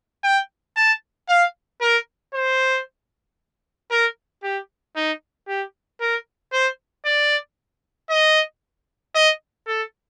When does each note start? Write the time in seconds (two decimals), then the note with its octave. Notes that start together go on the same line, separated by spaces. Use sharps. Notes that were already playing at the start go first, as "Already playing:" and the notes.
0.24 G5
0.76 A5
1.29 F5
1.81 A#4
2.34 C5
3.91 A#4
4.43 G4
4.96 D#4
5.48 G4
6.01 A#4
6.52 C5
7.05 D5
8.10 D#5
9.15 D#5
9.67 A4